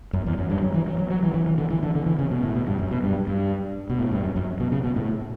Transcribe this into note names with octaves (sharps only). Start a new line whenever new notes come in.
F#2
E2
F#2
G2
F#3
E3
F#3
F#3
F#3
E3
E3
E3
D3
E3
D3
D3
E3
C#3
B2
A2
B2
G2
F#2
B2
G2
G2
B2
A2
G2
F#2
F#2
B2
C#3
B2
A2